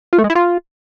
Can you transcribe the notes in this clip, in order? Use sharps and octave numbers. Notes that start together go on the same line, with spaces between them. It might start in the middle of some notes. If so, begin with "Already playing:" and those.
F4
A3
G#3
E4
F4